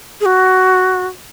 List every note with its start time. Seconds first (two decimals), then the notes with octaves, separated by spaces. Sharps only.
0.21 G#4
0.25 F#4